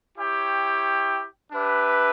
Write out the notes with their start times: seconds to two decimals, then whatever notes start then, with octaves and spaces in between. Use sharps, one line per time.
0.18 E4 G4 C#5 G5
1.52 D4 G4 B4 E5